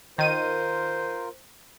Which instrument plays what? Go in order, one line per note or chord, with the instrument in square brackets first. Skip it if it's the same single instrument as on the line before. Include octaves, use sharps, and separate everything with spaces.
[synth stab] D#3 D#7 [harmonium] F4 A#4 [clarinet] C5